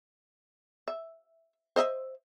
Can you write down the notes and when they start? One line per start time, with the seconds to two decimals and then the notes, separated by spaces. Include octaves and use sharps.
0.88 E5
1.76 C5 D#5 E5